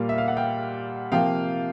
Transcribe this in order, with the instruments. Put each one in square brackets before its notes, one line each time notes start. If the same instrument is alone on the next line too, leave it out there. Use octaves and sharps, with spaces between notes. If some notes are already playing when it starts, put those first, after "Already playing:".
Already playing: [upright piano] A#2 G3 A#3 F5
E5
F5
F#5
F5 G5
C3 F3 A#3 F5 G5